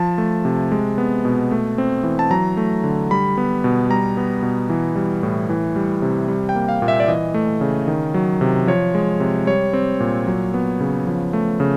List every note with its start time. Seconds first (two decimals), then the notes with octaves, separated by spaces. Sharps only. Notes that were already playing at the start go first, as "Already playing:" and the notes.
Already playing: F3 A5
0.18 A3
0.45 C3
0.72 G#3
0.98 B3
1.25 B2
1.51 A3
1.78 C4
2.04 E3
2.19 A5
2.31 F#3 A#5
2.57 A3
2.84 D3
3.11 G3 B5
3.38 B3
3.64 B2
3.90 G3 A#5
4.17 B3
4.43 B2
4.70 E3
4.96 G3
5.23 A2
5.49 E3
5.76 G3
6.02 C3
6.28 G3
6.49 G5
6.55 A#3
6.69 F5
6.82 A#2
6.88 E5
7.00 D5
7.08 E3 D#5
7.34 A3
7.61 C#3
7.88 D#3
8.14 F#3
8.41 C3
8.67 F3 C#5
8.95 G#3
9.20 C3
9.47 G3 C#5
9.73 C4
10.00 A#2
10.26 F#3
10.54 B3
10.81 C#3
11.07 F3
11.33 A3
11.60 C#3